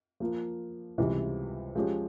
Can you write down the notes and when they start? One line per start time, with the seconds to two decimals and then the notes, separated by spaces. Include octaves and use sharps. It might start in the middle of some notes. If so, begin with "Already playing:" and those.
0.20 F3 A#3 F4
0.98 C#2 C3 E3 G3 C4
1.75 F3 G#3 C#4 G4